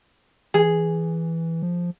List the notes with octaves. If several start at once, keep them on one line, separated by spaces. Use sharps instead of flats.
E3 G#4
F3